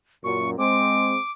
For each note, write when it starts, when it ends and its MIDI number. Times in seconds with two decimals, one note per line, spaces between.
0.24 0.57 42
0.24 0.57 46
0.24 0.50 85
0.58 1.16 56
0.58 1.16 60
0.58 1.31 86